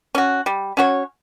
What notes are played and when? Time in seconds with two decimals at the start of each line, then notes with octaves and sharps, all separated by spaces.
0.15 C#4 F#4
0.46 G3
0.77 C#4 F#4 C#5